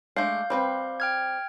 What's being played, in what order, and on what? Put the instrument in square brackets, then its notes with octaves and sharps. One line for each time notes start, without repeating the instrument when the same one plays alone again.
[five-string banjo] G#3 A3 D4 [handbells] F5 G6
[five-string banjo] G3 C4 B4
[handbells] G5 F6 G#6